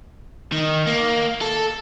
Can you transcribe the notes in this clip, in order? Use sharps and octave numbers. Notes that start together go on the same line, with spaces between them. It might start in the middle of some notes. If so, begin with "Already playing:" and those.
D#3
A#3
A4